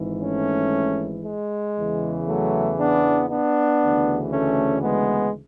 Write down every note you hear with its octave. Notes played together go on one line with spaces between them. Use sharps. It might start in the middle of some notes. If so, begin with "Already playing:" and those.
Already playing: G#1 G#2 E3
A3 C#4
G#3
E2 C#3 E3
F#3 A3
B3 D4
B3 D4
D2 C#3 E3
A3 C#4
G#3 B3